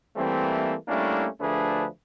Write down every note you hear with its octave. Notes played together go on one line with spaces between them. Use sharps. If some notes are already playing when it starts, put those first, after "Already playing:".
E3 G3 A3 A#3 C4
G3 A3 A#3 C#4 D4 E4
D2 F3 A3 D4 G#4 B4